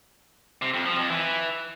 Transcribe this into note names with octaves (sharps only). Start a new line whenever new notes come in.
C3
F2
F3
F2
E3